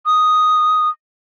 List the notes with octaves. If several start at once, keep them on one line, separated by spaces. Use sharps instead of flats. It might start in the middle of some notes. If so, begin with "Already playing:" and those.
D#6